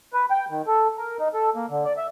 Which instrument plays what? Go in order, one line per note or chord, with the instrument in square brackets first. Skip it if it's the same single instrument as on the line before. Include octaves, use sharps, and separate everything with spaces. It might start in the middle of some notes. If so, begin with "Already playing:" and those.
[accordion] B4
G5
D#3
A4
A#4
D#4
A4
A#3
D3
D5
E5